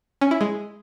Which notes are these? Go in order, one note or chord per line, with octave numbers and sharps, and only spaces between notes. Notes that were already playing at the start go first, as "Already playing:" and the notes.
C#4
E4
G#3